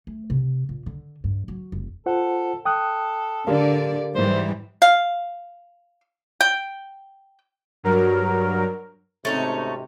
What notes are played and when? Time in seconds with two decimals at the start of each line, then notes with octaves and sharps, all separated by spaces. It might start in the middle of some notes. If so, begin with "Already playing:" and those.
0.07 A3
0.30 C3
0.69 A#2
0.86 D3
1.24 G2
1.48 F#3
1.72 F1
2.06 F4 A4 C5 F#5
2.65 A4 G5 D#6 F#6
3.47 D3 G4 A#4 D5 F5
4.15 G#2 E3 G3 C5
4.82 F5
6.41 G5
7.83 G2 F#3 A#4
9.25 G#1 C3 A3 C#4 D#4